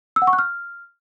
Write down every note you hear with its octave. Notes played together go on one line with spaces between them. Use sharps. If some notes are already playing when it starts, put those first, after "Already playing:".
E6
F#5
C#6
F#6
F6